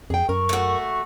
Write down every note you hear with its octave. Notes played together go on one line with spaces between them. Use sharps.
F2 G#4 G5
F#2 A#4 C#6
A3 F#4